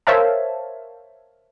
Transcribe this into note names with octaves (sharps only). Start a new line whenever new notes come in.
A#4 C5 C#5 E5 F5 A5